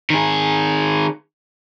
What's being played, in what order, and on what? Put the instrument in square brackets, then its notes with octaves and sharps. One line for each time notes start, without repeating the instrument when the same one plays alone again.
[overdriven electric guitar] D#3 G#4